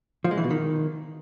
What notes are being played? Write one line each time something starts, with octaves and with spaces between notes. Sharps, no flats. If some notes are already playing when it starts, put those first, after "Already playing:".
F3
G#3
E3
B2
D#3